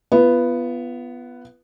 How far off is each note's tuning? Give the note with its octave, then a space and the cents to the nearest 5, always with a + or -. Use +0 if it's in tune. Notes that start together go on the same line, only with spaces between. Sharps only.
B3 +0 F4 -35